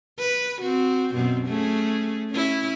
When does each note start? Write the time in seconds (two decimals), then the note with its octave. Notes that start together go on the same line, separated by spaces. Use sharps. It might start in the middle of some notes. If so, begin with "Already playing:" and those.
0.19 B4
0.61 C4 F#4
1.14 F#2 B2 C4
1.46 A3 C#4 G#4
2.31 C#4 E4